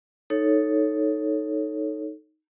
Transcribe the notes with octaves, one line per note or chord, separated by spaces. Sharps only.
D#4 A4 C#5